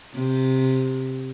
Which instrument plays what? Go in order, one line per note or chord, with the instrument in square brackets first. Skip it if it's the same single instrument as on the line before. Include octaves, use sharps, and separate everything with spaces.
[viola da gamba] C3